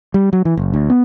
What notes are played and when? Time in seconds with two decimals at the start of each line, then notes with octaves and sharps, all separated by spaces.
0.14 G3
0.33 F#3
0.45 E3
0.57 F#1
0.74 D2
0.90 B3